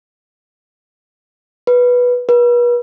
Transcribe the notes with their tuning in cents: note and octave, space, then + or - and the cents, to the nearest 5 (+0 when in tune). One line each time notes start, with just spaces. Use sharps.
B4 -10
B4 -40